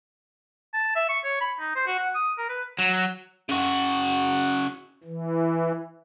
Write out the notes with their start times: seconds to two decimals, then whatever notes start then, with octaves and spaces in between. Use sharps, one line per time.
0.74 A5
0.96 E5
1.09 C#6
1.24 C#5
1.41 B5
1.60 D#4
1.75 C5
1.87 F#4
1.99 F#5
2.15 D#6
2.38 A#4
2.49 B4
2.79 F#3
3.49 C#3 F#4
5.04 E3